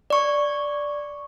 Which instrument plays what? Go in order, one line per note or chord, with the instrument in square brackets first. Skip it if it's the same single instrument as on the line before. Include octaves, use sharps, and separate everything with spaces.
[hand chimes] D5 C#6